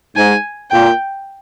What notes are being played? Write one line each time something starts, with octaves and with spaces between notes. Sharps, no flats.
G#2 G#5
A#2 G5